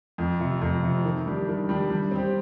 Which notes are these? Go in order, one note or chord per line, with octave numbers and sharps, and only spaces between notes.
F2
C3 F3
F2
C3 F3
D#3
G3 D4 G4
D#3
G3 D4 G4
G3
C4 G4